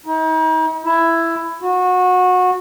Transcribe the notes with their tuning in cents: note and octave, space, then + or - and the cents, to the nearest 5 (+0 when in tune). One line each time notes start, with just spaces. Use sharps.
D#4 +40
E4 +10
F#4 -25